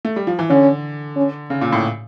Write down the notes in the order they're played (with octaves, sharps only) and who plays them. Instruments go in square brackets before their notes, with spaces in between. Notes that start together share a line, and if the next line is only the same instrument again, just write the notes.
[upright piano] A3
G3
F3
E3
[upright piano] D3 [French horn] C#4
[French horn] C#4
[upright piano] C#3
A#2
A2